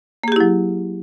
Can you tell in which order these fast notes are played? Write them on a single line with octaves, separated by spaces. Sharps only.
A#3 G#4 G4 E4 F#3